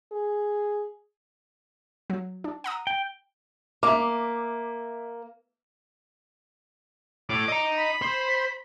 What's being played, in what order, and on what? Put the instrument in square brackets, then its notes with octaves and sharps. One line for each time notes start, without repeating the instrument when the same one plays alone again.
[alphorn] G#4
[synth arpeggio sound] F#3
D4
F#5 A#5 D#6
[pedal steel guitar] G5
[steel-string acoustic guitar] A#3 [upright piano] E5 D6
[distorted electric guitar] A2 [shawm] D6
[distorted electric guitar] D#5 A#5
[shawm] B5
[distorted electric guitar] C5